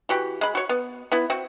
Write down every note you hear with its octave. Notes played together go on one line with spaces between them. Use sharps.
E3 F#4 G4
G#3 B5
F#4 C#5
B3
B3 E4
C4 F#4